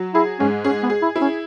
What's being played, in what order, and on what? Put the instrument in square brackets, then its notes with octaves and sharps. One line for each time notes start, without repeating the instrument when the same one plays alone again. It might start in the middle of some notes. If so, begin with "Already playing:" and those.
Already playing: [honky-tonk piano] F#3
[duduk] E4 [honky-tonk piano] G#4
[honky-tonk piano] G#2 [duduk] C#4
[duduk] C#4 [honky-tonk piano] G#4
[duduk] B3
[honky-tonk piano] G#4
[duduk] E4
[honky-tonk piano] E4
[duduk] C#4